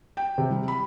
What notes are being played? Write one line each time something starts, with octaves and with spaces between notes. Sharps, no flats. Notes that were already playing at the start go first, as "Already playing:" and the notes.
G5
C3
G3
B5